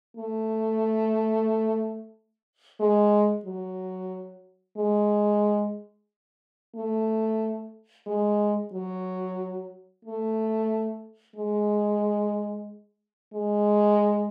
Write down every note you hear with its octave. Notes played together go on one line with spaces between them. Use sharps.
A3
G#3
F#3
G#3
A3
G#3
F#3
A3
G#3
G#3